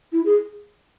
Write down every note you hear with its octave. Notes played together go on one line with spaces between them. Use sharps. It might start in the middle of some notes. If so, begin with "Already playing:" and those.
E4
G#4